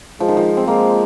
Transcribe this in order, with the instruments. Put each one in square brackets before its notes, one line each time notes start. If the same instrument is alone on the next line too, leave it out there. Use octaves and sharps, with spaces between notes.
[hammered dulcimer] F3 [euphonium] G#3
[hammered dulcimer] D#3
F3
C4
[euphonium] G#3 [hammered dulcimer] A#3